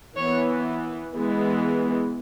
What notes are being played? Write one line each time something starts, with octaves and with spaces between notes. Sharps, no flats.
E3 B3 C#5
E3 G#3 B3